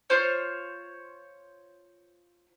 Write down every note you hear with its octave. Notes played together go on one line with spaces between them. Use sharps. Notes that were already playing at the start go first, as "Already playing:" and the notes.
F4 C5 C#5